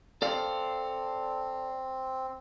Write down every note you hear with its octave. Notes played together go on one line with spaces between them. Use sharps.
C4 A4 D5 F5